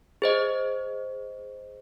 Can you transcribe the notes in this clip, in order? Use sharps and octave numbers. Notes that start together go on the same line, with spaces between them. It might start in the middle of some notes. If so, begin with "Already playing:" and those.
G#4 C5 D#5